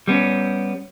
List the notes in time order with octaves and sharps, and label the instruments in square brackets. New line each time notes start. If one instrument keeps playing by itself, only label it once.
[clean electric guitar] G3 B3 C#4